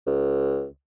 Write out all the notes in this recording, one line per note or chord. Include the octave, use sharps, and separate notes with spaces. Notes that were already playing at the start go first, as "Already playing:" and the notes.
C#2